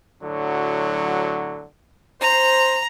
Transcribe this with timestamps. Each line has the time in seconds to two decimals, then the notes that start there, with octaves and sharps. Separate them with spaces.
0.23 A2 D3 F#3
2.22 C5 A#5